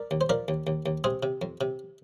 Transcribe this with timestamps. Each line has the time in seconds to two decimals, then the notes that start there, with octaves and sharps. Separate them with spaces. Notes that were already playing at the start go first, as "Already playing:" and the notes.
Already playing: A#4 D5
0.11 D#2
0.21 C5
0.29 F3 A#4 D5
0.48 D#2
0.67 D#2
0.86 D#2
1.04 C3 G#4 C5
1.23 C3
1.42 F2
1.61 C3